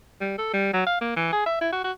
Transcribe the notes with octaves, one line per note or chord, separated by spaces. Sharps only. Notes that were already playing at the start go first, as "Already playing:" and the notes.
G3
A4
G3
F#3
F5
A#3
E3
G#4
E5
E4
F#4
F#4